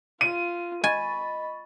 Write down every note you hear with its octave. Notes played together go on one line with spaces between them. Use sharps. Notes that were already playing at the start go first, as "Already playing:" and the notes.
F4 D#7
D#5 G#5 B5 C#6 A6